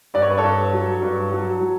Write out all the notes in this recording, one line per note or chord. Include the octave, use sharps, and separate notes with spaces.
G2 D5
C#5
B4
A4 C#5
G2
F#3
G2
F#3
F#3